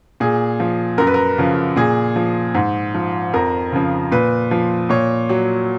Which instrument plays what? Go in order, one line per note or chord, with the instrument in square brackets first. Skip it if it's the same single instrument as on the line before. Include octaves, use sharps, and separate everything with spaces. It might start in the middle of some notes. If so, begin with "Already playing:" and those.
[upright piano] A#2 G#4
F3
F#2 A#4
B4
A#4
C#3 F3
A#2 G#4
F3
G#2
F3
F2 A#4
C#3 F3
A#2 B4
F3
A#2 C#5
F#3